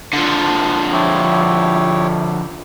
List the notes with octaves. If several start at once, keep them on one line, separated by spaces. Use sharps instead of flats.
D3 F3
E4 G4 C#5